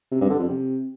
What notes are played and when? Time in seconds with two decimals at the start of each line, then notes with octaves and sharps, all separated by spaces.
0.12 C3
0.21 G2
0.30 D3
0.39 F2
0.48 C3